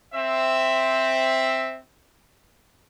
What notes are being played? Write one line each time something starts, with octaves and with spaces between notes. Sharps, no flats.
C4 E5